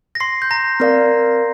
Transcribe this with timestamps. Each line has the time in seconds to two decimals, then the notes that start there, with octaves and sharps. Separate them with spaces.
0.15 A#6
0.20 C6 C7
0.42 G6
0.51 A#5 A#6
0.80 C4 A#4 D5 F5